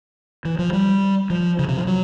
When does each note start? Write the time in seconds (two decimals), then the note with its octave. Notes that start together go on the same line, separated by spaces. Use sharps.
0.45 E3
0.59 F3
0.73 G3
1.30 F3
1.59 C#3
1.68 C3
1.78 F3
1.87 F#3